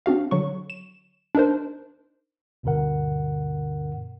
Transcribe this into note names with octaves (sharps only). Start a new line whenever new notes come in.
C4 D4 F#4 F5
D3 F#3 C#6
E7
D4 D#4 A#4 C5
D2 G2 B2 D3 A#4 F#5